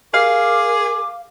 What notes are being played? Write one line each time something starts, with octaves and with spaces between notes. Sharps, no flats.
G#4 A#4 F5 D6